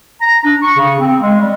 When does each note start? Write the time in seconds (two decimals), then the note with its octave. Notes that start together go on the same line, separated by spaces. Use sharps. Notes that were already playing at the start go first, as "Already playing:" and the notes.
0.21 A#5
0.44 D4
0.62 C#6
0.76 C#3
1.00 C4
1.21 G#3
1.40 G3